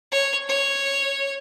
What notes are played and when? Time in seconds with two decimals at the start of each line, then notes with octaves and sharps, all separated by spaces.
0.12 C#5
0.49 C#5